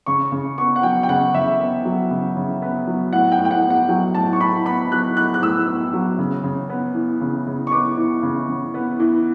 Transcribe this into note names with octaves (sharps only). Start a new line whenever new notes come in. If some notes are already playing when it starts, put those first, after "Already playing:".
C#3 C#6
C#3
B3 C#6
F#5
F#3 G5
G5
C#3 F#5
C#3 E5
B3
F#3
C#3
C#3
B3
F#3
A2 F#5
G5
A2
G5
F#5
B3
F#5
F#3 G5
A2 A5
C#6
A2 B5
B3 B5
F#3 F#6
A2 F#6
F#6
A2 E6
B3
F#3
C#3
C#3
B3
E3
C#3
C#3
C#6
B3 D6
E3
C#3
C#3
B3
E3